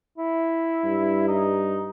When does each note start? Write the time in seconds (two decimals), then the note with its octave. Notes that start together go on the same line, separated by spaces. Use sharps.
0.18 E4
0.84 G2
1.28 D#4